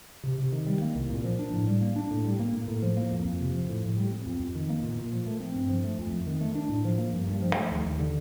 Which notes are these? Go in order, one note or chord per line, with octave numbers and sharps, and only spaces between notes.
C3
C3
D#3
G3
A#3
C2
A#2
F3
D4
A2
G3
A#3
D4
A2
G3
A#3
A2
A2
F3
A#3
F2
F2
C3
F3
A2
A2
G3
C4
F2
F2
D#3
A#3
A#2
A#2
F3
A3
C4
G2
F3
A3
F2
F2
D#3
A3
D4
A2
F3
A#3
G2
G2
F3
A3
D#2
D#2
D3